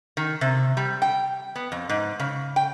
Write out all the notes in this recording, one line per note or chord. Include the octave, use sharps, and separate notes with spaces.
D#3
C3
G3
G5
B3
F2
G#2
C#3
G5